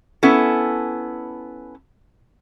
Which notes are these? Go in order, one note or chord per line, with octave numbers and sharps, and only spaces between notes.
B3 C#4 E4 A4